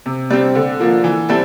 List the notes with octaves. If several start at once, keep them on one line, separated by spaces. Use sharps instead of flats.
C3
G3 C4
D3
F3 A#3
E3
G3 C4 E4 A4